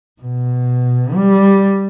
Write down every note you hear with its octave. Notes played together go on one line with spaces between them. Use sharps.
B2
G3